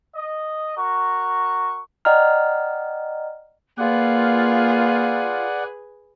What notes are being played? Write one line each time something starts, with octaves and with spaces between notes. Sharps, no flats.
D#5
F#4 A#4 C#6
D5 D#5 F#5 G5 A#5 F6
A#3 F4 G#4 B4 D5 F#5